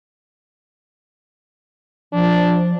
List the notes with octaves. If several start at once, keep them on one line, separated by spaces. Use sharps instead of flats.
F3 D4